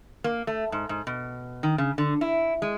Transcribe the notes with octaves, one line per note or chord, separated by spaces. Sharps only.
A#3
A3
G#2
G#2
B2
D#3
C#3
D3
E4
G#3